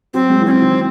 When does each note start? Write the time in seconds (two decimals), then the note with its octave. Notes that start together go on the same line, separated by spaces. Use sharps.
0.14 F#3 C4
0.30 G#3
0.41 E3
0.46 F#3 C#4
0.51 C4
0.62 D#3